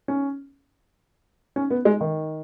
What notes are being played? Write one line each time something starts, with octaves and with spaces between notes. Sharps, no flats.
C#4
C#4
B3
G#3
D#3